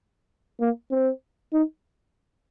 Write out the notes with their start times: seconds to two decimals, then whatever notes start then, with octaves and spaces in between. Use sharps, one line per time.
0.60 A#3
0.91 C4
1.53 D#4